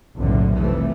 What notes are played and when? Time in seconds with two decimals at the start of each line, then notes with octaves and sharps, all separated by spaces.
0.17 F#1 B1 E2 A2 D3
0.56 F1 E3 G3 A3